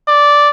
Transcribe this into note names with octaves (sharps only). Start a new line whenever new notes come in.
D5